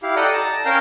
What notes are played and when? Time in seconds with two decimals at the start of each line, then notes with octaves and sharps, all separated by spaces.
0.03 E4 G4 F5
0.16 A4 D5 D#5 F#5 G5 A#5
0.33 A5 A#5
0.65 C#4 A#4 F5 G5 A#5 G6